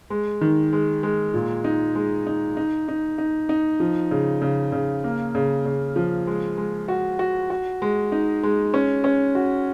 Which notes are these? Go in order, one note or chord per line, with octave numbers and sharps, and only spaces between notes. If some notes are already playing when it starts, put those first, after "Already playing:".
G#3
D#3
G#3
G#3
A#2
D#4
G#3
D#4
D#4
D#4
D#4
D#4
F3
C#3
C#3
C#3
A#3
C#3
C#3
F3
G#3
G#3
F#4
F#4
F#4
G#3
D#4
G#3
C#4
C#4
F#4